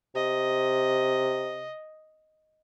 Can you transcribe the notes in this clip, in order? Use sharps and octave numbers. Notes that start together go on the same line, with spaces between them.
C3 D#5